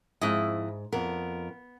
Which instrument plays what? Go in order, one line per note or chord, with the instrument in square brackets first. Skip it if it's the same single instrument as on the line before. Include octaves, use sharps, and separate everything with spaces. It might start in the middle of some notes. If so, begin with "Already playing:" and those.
[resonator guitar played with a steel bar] F2 E4 D#5 [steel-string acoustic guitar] G#2
[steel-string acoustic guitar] F2 A#4 [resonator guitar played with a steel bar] B3